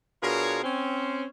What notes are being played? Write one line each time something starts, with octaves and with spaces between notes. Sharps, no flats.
B2 D4 F4 G#4 A#4 C#5
C4 C#4